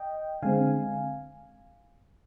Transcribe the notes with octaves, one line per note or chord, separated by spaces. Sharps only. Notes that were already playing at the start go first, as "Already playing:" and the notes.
Already playing: D#5 G5
D3 G#3 C4 F5 G#5